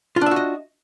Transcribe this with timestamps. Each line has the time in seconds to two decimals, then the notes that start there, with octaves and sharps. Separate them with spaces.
0.16 F4
0.21 D4
0.26 E5
0.31 F#4
0.36 D#5